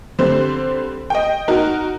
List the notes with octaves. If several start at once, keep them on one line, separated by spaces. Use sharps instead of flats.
D3 G3 C4 C5
D#5 G5
D#4 F#4 A#4